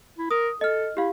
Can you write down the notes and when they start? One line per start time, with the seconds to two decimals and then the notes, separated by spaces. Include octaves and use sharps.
0.18 E4
0.31 A#4 D#6
0.61 A4 D#5 F6
0.97 E4 G4 F5